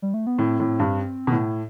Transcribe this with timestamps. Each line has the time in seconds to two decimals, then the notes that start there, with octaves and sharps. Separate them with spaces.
0.02 G3
0.14 A3
0.27 B3
0.38 A2 C4
0.60 A2
0.79 G2
1.27 B2
1.32 A2